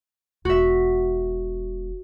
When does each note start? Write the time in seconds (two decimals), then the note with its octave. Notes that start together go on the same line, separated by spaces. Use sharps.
0.45 E1 F#4 E5